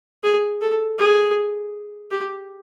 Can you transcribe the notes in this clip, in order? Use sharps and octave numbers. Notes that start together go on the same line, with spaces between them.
G#4
A4
G#4
G4